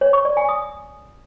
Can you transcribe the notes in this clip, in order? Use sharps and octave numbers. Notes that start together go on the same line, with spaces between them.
C#5
C#6
D5
G#5
D#6